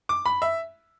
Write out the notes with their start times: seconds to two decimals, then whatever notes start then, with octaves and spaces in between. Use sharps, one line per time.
0.09 D6
0.26 B5
0.42 E5